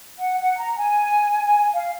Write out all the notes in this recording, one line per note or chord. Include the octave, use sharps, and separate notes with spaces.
F#5
F#5
A#5
G#5
F5